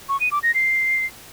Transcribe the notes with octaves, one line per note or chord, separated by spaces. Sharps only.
C#6
D#7
D6
A#6
C7